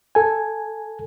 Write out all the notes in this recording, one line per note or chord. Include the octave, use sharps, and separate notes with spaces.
A4 G#5